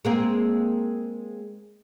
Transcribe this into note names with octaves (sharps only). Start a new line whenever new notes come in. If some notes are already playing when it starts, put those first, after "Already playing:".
G#3 A#3 C4